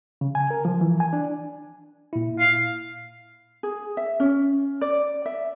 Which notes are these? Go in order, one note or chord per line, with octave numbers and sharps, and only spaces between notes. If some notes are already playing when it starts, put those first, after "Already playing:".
C#3
G#5
A#4
F3
E3
G#5
D4
A#2 E4
F5
G#4
E5
C#4
D5
E5